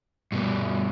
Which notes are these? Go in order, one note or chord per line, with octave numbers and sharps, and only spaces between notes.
G2 B2